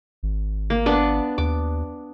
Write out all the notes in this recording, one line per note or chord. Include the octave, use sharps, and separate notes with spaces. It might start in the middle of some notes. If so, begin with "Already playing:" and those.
G#1
A#3
B3 D4
D#2 D6